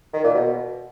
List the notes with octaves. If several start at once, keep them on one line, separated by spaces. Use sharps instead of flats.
D#3
A#2
B2